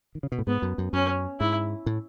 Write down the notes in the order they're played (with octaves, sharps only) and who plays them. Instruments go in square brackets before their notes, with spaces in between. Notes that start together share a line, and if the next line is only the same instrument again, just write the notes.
[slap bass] D#3
C#3
B2
A2
[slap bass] G#2 [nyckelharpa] B3
[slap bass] F#2
F#2
[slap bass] F#2 [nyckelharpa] C#4
[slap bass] G#2 [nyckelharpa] E4
[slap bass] A2